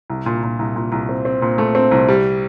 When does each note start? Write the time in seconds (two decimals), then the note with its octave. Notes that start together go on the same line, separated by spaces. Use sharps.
0.10 C2
0.26 A#2
0.43 A#2
0.59 C2
0.76 A#2
0.92 C2
1.09 C4
1.25 C4
1.42 A#2
1.58 A3
1.75 C4
1.91 C2
2.08 G3